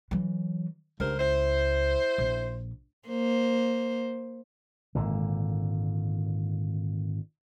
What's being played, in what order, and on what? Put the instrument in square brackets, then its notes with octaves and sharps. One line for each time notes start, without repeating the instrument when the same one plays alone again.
[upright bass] E3 F#3
[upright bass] C#2 [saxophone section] G2 A#4 C5
[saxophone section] E4 C5
[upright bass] A#1
[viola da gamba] A#3 C5
[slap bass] G#1 A#2 D3